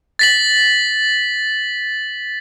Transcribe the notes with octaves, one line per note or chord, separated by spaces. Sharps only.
A6 B6 F#7